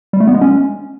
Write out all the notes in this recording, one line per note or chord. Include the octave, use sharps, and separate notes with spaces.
G3
A3
B3
G#3
C#4